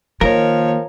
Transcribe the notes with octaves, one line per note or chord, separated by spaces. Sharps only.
D#3 F3 A#3 A#4 C#5